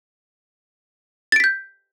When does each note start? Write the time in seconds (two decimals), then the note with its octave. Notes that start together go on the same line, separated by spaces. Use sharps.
1.32 A6
1.36 D7
1.40 B6
1.44 G6